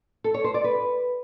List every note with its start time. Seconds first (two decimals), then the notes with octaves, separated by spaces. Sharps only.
0.24 A4
0.34 C#5
0.44 C5
0.54 D5
0.64 B4